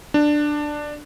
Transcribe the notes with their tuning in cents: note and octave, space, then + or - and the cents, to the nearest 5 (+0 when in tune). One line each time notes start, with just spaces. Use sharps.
D4 +10